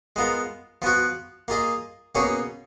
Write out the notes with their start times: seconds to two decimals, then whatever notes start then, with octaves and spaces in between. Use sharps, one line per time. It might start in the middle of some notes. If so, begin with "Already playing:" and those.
0.16 G#3 B3 F4 A#4
0.82 F3 B3 F#4 B4
1.48 A#3 F4 G#4 D#5
2.15 B2 A#3 C#4 G#4 C#5